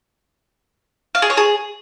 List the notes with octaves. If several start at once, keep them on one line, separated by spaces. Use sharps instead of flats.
F5
G#4
C#5
G#4